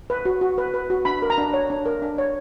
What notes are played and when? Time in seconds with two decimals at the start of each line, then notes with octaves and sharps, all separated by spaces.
0.10 B4
0.25 F#4
0.41 F#4
0.58 B4
0.74 B4
0.90 F#4
1.05 D4 B5
1.22 A#4
1.30 A#5
1.38 D4
1.54 C#5
1.70 D4
1.86 A#4
2.02 D4
2.18 C#5